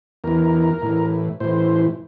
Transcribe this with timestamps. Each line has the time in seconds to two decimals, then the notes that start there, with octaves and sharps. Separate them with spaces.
0.24 E2 E3 A#4
0.82 A2 E3
1.40 A2 E3 C5